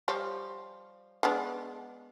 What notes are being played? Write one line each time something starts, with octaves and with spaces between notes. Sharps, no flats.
F3 G3 C#5
G#3 B3 D4